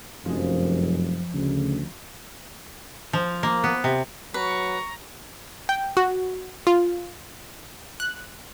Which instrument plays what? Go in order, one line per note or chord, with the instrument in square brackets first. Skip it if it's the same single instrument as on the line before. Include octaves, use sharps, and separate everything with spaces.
[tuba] F1 [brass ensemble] F#2 [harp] F3 G#3
[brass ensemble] D2 [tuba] C#3
[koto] F3
A#3
B3
C3
[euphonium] F#3 [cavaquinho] B4 [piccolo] A#5 [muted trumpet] C#6
[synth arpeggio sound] G5
F#4
F4
F#6